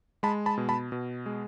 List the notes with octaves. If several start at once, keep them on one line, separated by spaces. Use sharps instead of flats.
G#3 A5 B5
A5 B5
B2
A5 B5
B2
G#3